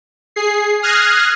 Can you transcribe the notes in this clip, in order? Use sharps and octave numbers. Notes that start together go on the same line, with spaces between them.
G#4 C7
D#6 F6 F#6 G#6 A#6 C7